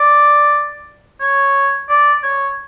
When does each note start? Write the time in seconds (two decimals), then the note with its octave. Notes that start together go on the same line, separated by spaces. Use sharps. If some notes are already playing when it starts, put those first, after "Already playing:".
Already playing: D5
1.21 C#5
1.89 D5
2.23 C#5